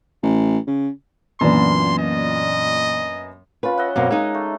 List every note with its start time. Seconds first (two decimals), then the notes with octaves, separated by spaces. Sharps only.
0.23 A1
0.67 C#3
1.41 F#2 A#2 E3 B3 D4 C6
1.99 D#5
3.63 C#4 F4 B4
3.78 D#5 E5 F#5
3.96 F#2 B2 A#3 C4
4.11 G#3 D#4
4.35 A3